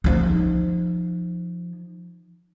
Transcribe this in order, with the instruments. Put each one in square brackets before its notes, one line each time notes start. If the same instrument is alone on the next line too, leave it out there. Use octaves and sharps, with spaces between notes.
[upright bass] F3 D#4